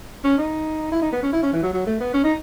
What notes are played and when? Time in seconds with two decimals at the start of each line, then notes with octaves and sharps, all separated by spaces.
0.24 C#4
0.38 D#4
0.92 E4
1.02 D#4
1.12 B3
1.22 C#4
1.32 E4
1.42 C#4
1.53 E3
1.62 F#3
1.73 F#3
1.86 A3
2.00 B3
2.14 C#4
2.24 D#4